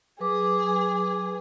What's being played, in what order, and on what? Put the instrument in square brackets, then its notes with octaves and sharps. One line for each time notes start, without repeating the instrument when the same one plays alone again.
[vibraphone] F#3 B4 D6 [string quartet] G#4